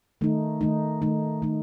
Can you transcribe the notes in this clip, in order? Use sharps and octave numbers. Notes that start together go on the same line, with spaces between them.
D#3 A3 D#4
D#3 A3 D#4
D#3 A3 D#4
D#3 A3 D#4